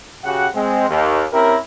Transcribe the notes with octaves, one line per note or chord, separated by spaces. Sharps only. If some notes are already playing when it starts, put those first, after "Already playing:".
C#3 F#4 G4 F#5
G#3 C4
D#2
C4 C#4 E4 G4 A#4